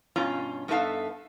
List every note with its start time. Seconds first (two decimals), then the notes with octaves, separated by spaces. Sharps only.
0.16 G2 B2 C#4 F4 A#5
0.68 G2 B3 D#4 A4 E5 F5